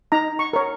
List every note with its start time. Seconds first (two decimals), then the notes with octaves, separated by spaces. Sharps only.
0.12 D#4 A#5
0.39 C#6
0.53 A#4 C#5